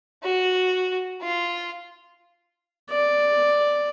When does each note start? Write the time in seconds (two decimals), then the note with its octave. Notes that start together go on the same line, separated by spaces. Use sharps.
0.23 F#4
1.21 F4
2.91 D5